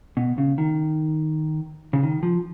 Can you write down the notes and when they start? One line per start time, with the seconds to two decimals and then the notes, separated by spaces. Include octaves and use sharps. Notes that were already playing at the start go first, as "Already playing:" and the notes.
0.17 B2
0.38 C#3
0.58 D#3
1.93 C#3
2.03 D#3
2.23 F3